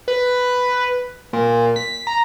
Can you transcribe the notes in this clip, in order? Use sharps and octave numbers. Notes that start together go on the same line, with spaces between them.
B4
A#2
B6
A#5